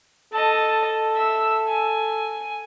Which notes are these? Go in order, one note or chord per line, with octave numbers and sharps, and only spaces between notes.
A4 D#5 A5
E5 E6
G#5